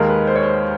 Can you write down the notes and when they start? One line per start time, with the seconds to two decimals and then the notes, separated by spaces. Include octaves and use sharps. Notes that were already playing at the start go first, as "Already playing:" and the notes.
Already playing: D#2 D#3 G#3 A#4
0.09 B4
0.27 C5
0.36 C#5
0.43 C5